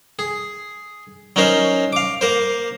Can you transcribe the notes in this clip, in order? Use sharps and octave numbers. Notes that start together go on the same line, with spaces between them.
G#4
F#3 C#4 D#4 A#4 C5
F5 D6
A#3 A#4 C5